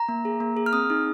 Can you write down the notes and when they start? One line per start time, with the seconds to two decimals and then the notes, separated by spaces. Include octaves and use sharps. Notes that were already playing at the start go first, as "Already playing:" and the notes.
Already playing: A#5
0.09 A#3
0.25 G#4
0.40 A#3
0.57 G#4
0.66 F6
0.73 C4 D#6
0.90 D#4 G#4